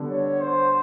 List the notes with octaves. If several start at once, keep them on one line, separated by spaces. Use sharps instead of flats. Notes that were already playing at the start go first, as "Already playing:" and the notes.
Already playing: D3 G3 B3 D4
C#5
C5